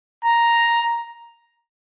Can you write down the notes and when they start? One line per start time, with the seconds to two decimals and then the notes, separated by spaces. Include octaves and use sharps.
0.25 A#5